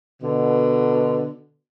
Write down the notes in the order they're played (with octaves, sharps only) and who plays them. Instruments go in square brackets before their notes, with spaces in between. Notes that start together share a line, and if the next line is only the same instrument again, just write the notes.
[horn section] B2 D3